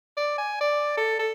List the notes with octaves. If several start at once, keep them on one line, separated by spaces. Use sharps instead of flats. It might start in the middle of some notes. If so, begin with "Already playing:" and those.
D5
G#5
D5
A4
A4